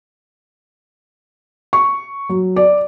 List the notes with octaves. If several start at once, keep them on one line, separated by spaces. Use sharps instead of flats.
C#6
F#3
D5